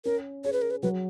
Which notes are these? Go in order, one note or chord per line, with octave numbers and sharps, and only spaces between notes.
C#4 A#4
G#4 C#5
B4
A#4
B4
F#3 B4